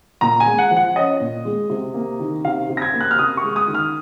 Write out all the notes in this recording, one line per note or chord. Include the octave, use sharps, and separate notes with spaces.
A#2 A#5
G#5
G#3
F#5
F3
F#5
C#4 D#5
A#2
G#3
C3
A#3
D#3
C3 F5
C3
A#6
G#6
A#3
F#6
F6
C3 D#6
C#6
G#3
D#6
D#3
F6